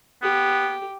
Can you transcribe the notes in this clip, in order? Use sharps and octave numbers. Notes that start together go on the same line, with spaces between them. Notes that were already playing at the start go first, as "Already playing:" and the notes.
B3 G4